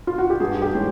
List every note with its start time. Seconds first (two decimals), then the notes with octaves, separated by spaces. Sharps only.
0.07 F4
0.18 F#4
0.30 G4
0.40 G2 G#4
0.62 G4
0.73 E3 G#3 C#4